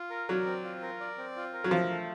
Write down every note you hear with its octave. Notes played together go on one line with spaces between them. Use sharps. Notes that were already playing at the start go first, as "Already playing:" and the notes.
Already playing: F4
A#4
F#3 D5
C4
F4
A#4
D5
C4
F4
A#4
F#3
F3 A3
A3